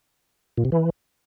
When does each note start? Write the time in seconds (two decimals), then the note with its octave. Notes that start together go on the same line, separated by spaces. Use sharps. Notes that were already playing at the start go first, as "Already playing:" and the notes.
0.58 A#2
0.65 C3
0.72 E3